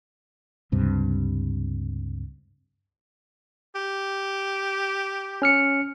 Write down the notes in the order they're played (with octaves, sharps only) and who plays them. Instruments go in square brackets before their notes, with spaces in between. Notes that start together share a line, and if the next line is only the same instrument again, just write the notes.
[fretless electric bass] C#2 G2 C3
[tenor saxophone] G4
[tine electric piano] C#4 F6 C#7